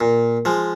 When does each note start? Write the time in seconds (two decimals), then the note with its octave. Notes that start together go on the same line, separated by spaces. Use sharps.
0.01 A#2
0.45 F3 G#3